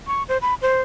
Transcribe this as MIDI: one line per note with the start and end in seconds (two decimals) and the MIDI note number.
0.07 0.23 85
0.29 0.38 72
0.42 0.55 83
0.62 0.82 72